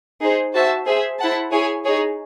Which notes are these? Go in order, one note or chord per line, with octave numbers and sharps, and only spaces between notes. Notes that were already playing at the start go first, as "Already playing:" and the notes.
D#4 G#4 C5
F#4 C5 E5 A5
G#4 C5 E5
E4 C5 F#5 A5
E4 G#4 C#5 G#5
D#4 G#4 C#5